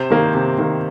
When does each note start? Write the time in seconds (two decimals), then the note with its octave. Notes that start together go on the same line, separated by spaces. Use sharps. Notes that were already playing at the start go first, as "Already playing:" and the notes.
Already playing: C3 C5
0.10 D#3 A#3
0.34 C3
0.58 D#3 A#3